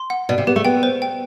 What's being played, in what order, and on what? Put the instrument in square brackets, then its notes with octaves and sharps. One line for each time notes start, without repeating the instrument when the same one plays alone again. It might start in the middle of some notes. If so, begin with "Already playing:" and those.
Already playing: [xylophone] C6
F#5
[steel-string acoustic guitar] B2 [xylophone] D5
[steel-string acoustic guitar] C3
[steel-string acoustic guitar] B3 [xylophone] G4
[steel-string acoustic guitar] A3
[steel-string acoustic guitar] B3 [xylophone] G5
[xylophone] C5
G5